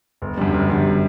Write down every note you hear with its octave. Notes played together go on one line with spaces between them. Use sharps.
G1
F#2 D3 G3
G1
F#2 D3 G3